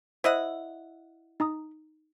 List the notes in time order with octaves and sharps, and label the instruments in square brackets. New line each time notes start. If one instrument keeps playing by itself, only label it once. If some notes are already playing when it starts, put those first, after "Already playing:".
[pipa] E4 D#5 F#5 [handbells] C5
[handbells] D#4 A#5 D#6